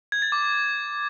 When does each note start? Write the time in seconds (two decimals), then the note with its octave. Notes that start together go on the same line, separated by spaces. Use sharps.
0.12 G#6
0.22 A6
0.32 D6